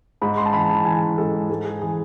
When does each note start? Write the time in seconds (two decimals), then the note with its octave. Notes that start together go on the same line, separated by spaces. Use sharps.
0.22 G#2 B5
0.37 C6
0.46 A5
0.53 E3 B5
0.70 A5
0.85 E3 G#5
1.18 G#2 A4
1.49 G#2 A4
1.65 G#4
1.82 E3 G#4